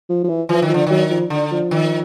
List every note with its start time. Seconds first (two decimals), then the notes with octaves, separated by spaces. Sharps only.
0.09 F3
0.24 F3
0.29 E3
0.49 E3 F3
0.62 D#3
0.69 F3
0.74 D3
0.87 D#3 F#3
1.10 F3
1.30 D3
1.51 F3
1.71 D#3